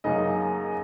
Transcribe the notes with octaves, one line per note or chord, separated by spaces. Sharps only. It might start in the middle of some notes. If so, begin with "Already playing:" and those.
F#2 C#3 F#3 A#3 D#4 D#5